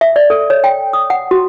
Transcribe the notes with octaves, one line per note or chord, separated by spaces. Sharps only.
E5
D5
A4
C#5
G5
D#6
F#5
F#4